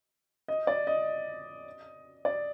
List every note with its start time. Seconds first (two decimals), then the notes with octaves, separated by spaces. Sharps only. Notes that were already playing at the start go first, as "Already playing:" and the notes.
0.48 D#5
0.67 D5
0.87 D#5
2.25 D5